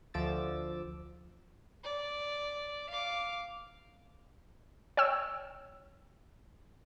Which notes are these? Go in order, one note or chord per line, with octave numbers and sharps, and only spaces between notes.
D2 F3 D6 E6 A6
D5
F5 D6
C#5 G5 E6